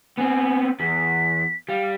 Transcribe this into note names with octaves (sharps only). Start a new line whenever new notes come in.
B3 C4 G#5
E2 B6
G3 F5